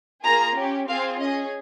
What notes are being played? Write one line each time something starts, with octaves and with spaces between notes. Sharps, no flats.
A#3 F4 G#4 A#5
C#4 G4
C4 F4 G#4 F5
C#4 G#4 D#5